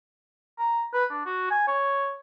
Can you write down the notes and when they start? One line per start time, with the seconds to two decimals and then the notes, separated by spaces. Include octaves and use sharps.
0.59 A#5
0.94 B4
1.10 D4
1.26 F#4
1.50 G#5
1.68 C#5